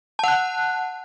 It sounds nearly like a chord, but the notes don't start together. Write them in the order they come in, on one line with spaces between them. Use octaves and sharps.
A5 F#5 F#6